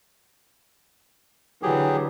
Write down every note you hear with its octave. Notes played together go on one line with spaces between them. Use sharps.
D3 E3 F#3 G4 G#4